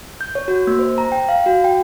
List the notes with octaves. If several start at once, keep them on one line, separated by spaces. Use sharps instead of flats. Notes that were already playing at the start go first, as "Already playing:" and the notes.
G6
C#5
F#4
A#3
C5
A#5
G5
F5
F#4
G5